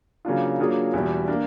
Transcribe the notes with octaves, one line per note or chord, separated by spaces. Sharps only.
C#3 F#3 A#3 D4 F4
F#3 A#3 D4 F4 G#4
E2 B2 G3
A#3 D4